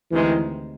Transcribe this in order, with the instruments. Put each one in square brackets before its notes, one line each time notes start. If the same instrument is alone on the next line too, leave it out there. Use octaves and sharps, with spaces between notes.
[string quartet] D2 C3 D#3 G#3 [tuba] E3